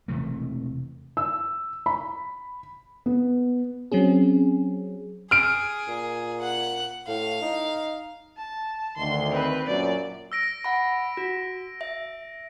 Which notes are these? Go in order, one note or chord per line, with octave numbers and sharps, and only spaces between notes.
E1 C3 E3 A3
E6
B5
B3
F#3 C4 C#4 G#4
G#4 F6 D7
A#2
F#5 F#6
A2 F5
D#4
A5
D2 D#3 C6
C4 B4
F#2 A#2 D5
E6 A#6 D7
F#5 B5 D7
F#4
E5